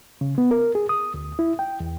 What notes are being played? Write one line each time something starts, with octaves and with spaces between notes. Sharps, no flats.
C#3
B3
A#4
G#4
D#6
D2
E4
G5
E2